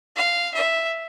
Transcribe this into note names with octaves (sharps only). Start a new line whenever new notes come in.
F5
E5